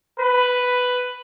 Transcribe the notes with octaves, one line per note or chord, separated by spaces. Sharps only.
B4